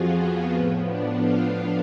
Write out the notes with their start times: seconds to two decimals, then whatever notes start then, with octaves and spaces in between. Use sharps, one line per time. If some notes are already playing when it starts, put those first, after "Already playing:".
Already playing: F2 F3 F4 F#4 G#4
0.16 B3
0.52 A2 F3
0.87 D4
1.21 F4